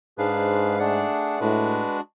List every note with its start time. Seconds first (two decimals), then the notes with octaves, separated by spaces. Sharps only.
0.18 G#2 D4 G#4 B4 F5
0.79 A3 D4 G#4 D5 F#5
1.39 A2 G#3 D4 F#4 B4